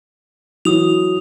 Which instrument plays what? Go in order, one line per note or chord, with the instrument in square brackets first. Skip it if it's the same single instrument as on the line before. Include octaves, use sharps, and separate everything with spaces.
[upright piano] E3 F#3 [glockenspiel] D#6 F7